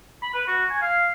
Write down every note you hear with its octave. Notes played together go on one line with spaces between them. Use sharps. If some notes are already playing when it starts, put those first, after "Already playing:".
B5
B4
F#4
G#5
F5